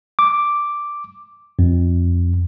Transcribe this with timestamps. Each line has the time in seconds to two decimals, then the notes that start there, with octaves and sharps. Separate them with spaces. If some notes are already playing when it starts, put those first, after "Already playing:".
0.19 D6
1.59 F2